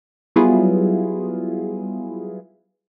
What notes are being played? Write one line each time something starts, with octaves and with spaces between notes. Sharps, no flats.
F#3 G3 B3 E4 F4 G#4